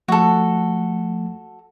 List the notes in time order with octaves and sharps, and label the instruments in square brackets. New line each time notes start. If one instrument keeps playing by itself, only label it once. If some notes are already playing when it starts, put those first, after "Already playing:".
[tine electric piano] F3 A3 [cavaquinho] F#4 A4